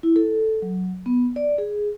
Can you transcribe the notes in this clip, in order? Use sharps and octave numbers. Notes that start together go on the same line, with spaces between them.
E4
A4
F#3
B3
D5
G#4